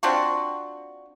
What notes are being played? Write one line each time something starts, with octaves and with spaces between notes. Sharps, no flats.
C4 D4 F4 F#4